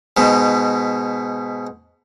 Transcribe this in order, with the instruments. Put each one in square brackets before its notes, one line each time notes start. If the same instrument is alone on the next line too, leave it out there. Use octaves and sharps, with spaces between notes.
[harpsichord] G#2 B2